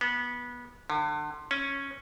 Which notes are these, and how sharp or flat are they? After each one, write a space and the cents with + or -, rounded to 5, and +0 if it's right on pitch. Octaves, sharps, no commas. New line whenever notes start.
B3 -20
D3 +35
C#4 -5